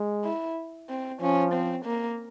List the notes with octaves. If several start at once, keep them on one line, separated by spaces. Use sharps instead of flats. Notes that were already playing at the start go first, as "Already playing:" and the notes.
Already playing: G#3
E4
C4
F3 C#4
C4
A#3